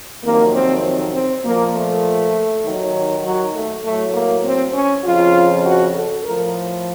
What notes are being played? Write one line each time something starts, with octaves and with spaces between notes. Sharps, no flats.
F2 C3 D#3 F#3 A#3
C4
C4
A#2 F3 A#3
A3
D#2 D#3 F#3
F#3
A3
A2 F#3 A3
A#3
C4
C#4
F2 C#3 F3 F4
F#4
A4
A2 F3 A#4